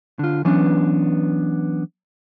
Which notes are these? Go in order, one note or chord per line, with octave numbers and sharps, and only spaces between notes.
D3 F4
E3 F#3 B3 C#4 D4